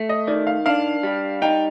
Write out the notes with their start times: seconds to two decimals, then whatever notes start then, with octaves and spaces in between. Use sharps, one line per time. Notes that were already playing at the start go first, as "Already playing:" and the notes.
Already playing: A3
0.09 D#5
0.27 D#3 D5
0.47 F5
0.66 D4 F5
1.03 G3
1.42 D#4 G5